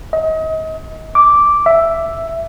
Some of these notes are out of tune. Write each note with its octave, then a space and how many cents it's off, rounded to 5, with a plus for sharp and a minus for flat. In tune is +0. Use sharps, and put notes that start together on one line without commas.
D#5 +35
D6 -5
E5 +5